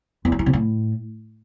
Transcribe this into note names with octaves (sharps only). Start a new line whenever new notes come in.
E2
F#3
E3
C3
A2